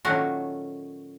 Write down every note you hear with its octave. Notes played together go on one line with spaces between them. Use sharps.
A#2 D#3 F#3 A3 C#4 F#4